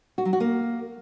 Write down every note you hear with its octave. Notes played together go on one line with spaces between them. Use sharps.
F#4
F#3
F#4
A#3